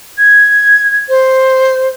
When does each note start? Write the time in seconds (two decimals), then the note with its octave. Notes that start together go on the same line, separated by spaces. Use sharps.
0.18 G#6
1.09 C5